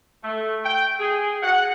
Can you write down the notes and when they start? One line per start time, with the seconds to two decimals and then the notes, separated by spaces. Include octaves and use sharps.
0.23 A3
0.65 G5
0.99 G#4
1.43 F#5